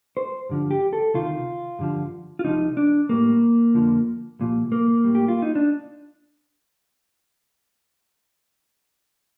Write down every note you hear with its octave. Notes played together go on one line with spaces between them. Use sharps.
C5
G2 D3 F3
G4
A4
D2 C3 D#3 F4
G2 D3 F3
F4
C2 C3 F3 D#4
D4
A2 G3 A#3
F2 D3 F3
C2 A#2 F3
A#3
A2 G3
G4
F4
D#4
D4